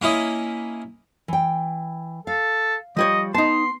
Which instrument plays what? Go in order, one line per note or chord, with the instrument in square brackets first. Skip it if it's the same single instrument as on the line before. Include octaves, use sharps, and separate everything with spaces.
[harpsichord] A#3 C#4 E4 D#5
[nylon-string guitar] E3 G5
[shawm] A4 [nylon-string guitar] F5
[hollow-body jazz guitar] F3 G3 C#5 [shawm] D#5
[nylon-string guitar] B3 [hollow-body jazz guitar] D#4 A5 [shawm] C6